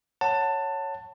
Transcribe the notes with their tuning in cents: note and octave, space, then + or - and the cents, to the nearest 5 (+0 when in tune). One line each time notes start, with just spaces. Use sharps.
C#5 +0 F#5 +0 A5 +20